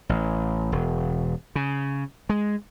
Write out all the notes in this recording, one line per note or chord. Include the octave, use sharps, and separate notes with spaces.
A1
E1
C#3
G#3